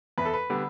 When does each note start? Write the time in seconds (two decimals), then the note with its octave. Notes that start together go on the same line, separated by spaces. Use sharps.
0.18 E2 B4
0.25 A4
0.33 B4
0.50 D3 G3 B3